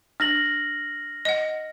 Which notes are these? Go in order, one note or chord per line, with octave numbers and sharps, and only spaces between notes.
D4 F6 A#6 F#7
D#5 F#5